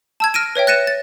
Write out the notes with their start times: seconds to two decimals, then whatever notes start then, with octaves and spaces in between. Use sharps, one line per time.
0.20 A5 E6 G#6
0.34 F6 A#6 D7 D#7
0.55 B4 C#5 E5 G5
0.67 F#6 A6 A#6 C#7 D#7 E7
0.87 A6